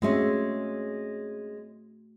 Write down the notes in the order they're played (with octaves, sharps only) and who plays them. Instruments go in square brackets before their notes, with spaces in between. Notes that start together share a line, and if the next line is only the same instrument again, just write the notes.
[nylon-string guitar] G#3 C4 C#4 [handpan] A3 F#4 E5